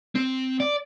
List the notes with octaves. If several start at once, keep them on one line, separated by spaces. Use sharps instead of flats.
C4
D5